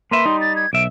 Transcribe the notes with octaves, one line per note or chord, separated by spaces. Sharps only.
A#3 B4 E5 C6
G3 D#4
A6
G#6
B1 E5 D7